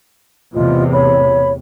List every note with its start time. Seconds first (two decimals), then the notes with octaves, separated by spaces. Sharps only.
0.54 E2 A2 C3 F4 D#5
0.92 C#5 B5